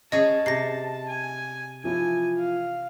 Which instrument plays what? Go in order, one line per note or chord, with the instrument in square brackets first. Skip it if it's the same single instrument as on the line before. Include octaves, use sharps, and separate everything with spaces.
[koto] C#4 G#4 [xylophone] D#5 [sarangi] A5
[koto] C3 [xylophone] A#6 C7
[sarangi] G#5
[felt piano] E3 F3 E4 [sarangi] G#5
[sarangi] F5